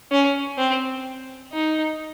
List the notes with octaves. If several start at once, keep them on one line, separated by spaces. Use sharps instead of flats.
C#4
C4
D#4